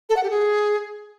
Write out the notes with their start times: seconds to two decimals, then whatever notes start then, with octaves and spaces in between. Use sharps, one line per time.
0.09 A4
0.16 F#5
0.23 G4
0.30 G#4